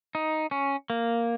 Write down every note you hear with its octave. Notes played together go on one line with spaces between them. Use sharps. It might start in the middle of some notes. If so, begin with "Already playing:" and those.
D#4
C#4
A#3